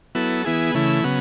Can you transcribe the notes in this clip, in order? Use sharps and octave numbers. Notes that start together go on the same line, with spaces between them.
F#3 B3 E4 A4
E3 B3 E4 G#4
C#3 E3 A3 E4
C#3 F#3 B3